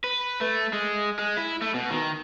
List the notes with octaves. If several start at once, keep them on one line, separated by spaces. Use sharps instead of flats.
B4
A3
G#3
G#3
E4
A3
B2
D#3